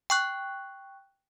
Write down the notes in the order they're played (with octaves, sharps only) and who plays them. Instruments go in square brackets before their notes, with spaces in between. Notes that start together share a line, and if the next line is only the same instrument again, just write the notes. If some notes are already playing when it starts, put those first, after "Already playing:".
[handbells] G5 C#6 F#6